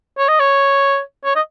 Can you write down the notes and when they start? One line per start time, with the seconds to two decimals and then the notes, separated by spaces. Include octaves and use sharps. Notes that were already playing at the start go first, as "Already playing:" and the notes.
0.18 C#5
0.28 D#5
0.39 C#5
1.25 C#5
1.36 D#5